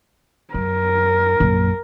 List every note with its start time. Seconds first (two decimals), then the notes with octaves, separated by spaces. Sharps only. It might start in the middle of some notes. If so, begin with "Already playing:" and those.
0.54 F#2 A#4
1.40 A#1 F#2